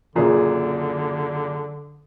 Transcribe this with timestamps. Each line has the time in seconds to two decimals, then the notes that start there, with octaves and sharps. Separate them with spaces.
0.15 F#1 A#2 D3 G#4